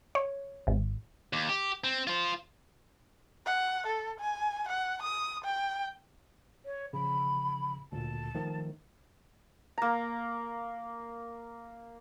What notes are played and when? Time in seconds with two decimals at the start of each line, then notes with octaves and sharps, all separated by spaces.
0.15 C#5
0.67 G#1
1.33 D#2
1.49 G4
1.84 C4
2.07 F4 C5
3.46 F#5
3.86 A4
4.20 G#5
4.68 F#5
5.02 D#6
5.44 G5
6.65 C#5
6.93 C#3 F3 B5
7.92 D2 A#2 A5
8.35 D#3 F3 A3
9.78 A#3 A#5